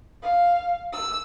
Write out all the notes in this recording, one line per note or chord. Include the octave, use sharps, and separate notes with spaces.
F5
E6